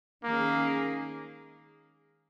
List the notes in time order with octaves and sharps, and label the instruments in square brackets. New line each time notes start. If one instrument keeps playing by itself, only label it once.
[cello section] D#3 G#3 C#4 G#4 [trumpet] A#3